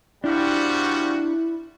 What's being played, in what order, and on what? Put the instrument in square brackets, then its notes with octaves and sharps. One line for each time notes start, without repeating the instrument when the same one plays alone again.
[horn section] F3 F#4 [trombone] G3 [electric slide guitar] D4 G4 [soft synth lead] E4